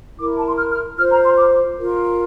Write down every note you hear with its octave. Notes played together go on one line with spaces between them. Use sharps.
E4 A#4 D6
A5
C6
F6
F6
F4 C5 F6
A#5
C6
D6
F4 A#4